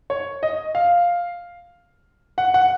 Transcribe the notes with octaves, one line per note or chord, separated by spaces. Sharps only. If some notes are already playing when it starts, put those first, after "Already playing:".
C#5
D#5
F5
F#5
F#5